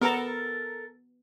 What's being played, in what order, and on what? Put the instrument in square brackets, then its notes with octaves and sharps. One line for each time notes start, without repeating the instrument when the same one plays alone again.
[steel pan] B3 A#5 [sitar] A4 A#4